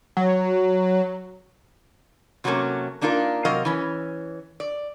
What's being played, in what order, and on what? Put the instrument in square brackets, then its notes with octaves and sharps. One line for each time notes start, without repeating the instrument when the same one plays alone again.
[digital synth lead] F#3
[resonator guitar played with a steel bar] C3 F#3 G3 A3 A#3 C#4
A#3 D4 D#4 F4 A#4
C3 F#3 A#4 D#5 F5
E3 C#4
D5